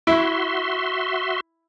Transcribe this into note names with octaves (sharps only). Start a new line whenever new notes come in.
E4 F#4 E5 C6